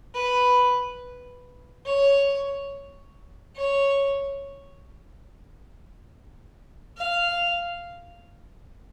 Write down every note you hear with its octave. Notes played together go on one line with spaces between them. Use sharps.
B4
C#5
C#5
F5